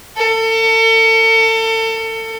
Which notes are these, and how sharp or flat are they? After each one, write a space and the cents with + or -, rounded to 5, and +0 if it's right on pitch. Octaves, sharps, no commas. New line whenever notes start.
A4 +35